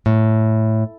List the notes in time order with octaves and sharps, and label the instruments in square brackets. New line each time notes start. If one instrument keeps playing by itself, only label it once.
[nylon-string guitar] A2